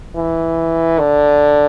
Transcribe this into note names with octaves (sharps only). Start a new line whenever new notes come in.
E3
D3